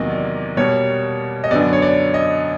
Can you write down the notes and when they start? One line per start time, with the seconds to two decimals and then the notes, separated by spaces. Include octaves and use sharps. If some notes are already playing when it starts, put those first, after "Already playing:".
Already playing: E2 C3 D#3 F#3 A#3 D#5
0.10 D5
0.57 B2 G3 A#3 C#5
1.44 D#5
1.51 F#2 D3 F#3 B3 D5
1.73 C#5
1.82 D5
2.14 D#5